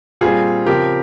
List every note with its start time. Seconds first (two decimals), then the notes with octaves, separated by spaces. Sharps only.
0.21 A#2 G3 C4 F4 G#4
0.67 C#3 F3 C4 G4 A#4